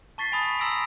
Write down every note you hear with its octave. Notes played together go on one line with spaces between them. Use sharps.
A5 C#6 A6 B6 C7 G7
G#5 B5 D#6
A#5 C6 E6 A#6 B6 D7